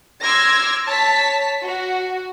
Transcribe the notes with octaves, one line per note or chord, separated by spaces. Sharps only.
C6 D6 E6 F6 G#6 A#6
C#5 A5 B6
F#4